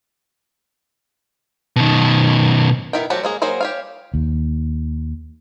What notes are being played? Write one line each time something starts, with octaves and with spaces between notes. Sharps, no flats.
B2 D#3
D#3 B3 E4 A#4 G5
F3 F#3 A3 F#4 G4
G#3 A#3 G#4
F#3 A#3 G#4 C5
G4 C#5 F5
D#2